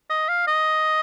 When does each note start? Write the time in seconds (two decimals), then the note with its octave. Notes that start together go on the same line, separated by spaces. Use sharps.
0.10 D#5
0.29 F5
0.47 D#5